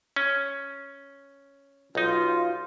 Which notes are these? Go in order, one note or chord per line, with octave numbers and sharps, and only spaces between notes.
C#4
B1 D#4 F4